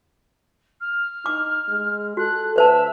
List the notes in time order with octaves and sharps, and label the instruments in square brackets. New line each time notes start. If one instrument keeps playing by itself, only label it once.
[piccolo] F6
[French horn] D#4 [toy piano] D6
[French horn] G#3
[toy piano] F#4 [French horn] A4 [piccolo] F#6
[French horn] D2 [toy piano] B4 C5 A5 [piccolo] E5